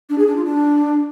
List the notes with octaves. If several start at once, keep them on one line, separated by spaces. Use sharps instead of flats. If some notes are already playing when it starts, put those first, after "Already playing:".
D4
G#4
D4
F4
D4